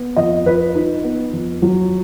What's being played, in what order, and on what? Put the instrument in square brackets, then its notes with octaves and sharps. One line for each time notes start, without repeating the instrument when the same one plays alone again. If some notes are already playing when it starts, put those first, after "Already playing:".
Already playing: [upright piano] B3
F2 D#5
F3 B4
D#4
B3
F2
F#3